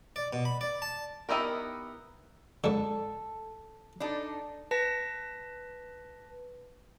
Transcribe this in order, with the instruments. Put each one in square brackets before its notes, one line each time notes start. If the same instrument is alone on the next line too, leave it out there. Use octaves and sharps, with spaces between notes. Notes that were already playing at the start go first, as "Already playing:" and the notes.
[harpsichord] D5
B2
B5
D5
A5
[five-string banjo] B3 D#4 E4 G4 A#4
[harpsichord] G#2 D3 [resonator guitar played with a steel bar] A4
[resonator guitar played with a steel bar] D4 D#4 A4
[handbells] B4 A5 A#6 B6